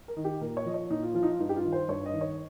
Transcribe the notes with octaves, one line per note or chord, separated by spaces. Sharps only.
A#4
D#3
G4
A#2 A#4
C#5
F3 D#5
C#5
A#2 D#4
F4
F3 F4
D#4
F4
G2 D#4
G4
F4
D#3
C5
G2 C#5
D#5
D#3
C#5